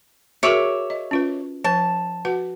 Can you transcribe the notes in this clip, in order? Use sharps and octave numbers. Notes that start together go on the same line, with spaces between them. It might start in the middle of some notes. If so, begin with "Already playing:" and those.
F#4 G#4 A#4 C#5 E5 D6
D#5
C#4 F4 B4
F3 B4 A5
F#4 B4 F#5